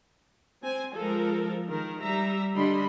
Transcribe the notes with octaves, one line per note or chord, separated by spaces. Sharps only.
C4 C5 G#5
F3 G#3 A4 A#4
D#3 A#4
G3 E5 A#5
D3 G3 D4 D#5 B5 C6